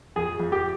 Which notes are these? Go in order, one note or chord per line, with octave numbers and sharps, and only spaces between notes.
F2 G#4
F2
G4